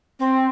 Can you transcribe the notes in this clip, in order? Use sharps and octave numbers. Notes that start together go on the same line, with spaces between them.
C4